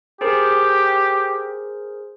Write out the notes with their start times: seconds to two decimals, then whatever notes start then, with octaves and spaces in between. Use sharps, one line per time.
0.21 G4 G#4 A#4 C5